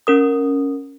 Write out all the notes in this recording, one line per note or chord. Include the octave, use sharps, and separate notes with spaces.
C#4 A#4 D#6